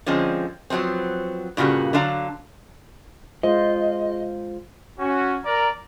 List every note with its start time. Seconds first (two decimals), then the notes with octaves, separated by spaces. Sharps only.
0.06 D3 F3 G#3 C4 C#4
0.70 F3 F#3 G#3 B3 C4
1.57 G2 A#2 C#3 F#4 G4
1.93 D3 F#3 D4 F5 A#5
3.43 G#3 F4 C5 D#5
4.99 C#4 F#4
5.45 A#4 D5 A#5